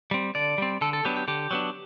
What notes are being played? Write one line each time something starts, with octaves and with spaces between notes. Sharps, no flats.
G3 C4
D3 D5
G3 C4
D3 A4
A4
F#3 B3 D4 G4
G4
D3 G4
F#3 B3 D4